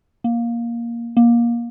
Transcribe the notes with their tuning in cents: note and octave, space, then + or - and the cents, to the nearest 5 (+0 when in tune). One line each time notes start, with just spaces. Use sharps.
A#3 +10
A#3 +20